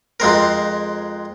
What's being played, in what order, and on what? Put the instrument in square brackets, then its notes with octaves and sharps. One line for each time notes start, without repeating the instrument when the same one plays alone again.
[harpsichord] F2 G#3 C4 A#4